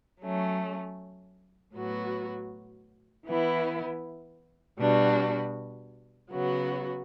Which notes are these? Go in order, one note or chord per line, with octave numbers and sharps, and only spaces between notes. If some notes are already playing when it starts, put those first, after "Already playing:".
F#3 A3 C#4
A2 F#3 B3 F#4
E3 B3 E4
B2 G3 D4 F#4
C#3 F#3 B3 F#4